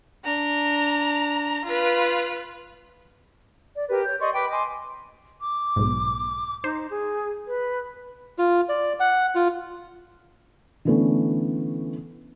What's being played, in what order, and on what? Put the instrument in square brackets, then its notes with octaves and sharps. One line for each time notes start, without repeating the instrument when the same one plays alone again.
[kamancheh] D4 A#5
F4 B4
[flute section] D5
G4 A#4 B4
C#5 G6
D5 D#5 C6 C#6
B4 G5 B5 D6
D#5 G#5 C6 D6
[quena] D6
[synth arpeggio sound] B1 G#2
[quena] D#4 [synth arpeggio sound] C5
[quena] G#4
B4
[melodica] F4
D5
F#5
F4
[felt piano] D3 E3 A3 B3 C#4